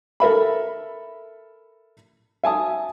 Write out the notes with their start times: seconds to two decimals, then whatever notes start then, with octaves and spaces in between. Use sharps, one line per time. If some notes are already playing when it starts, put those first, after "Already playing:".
0.20 A4 A#4 E5 B5
2.43 E5 G#5 A5 D#6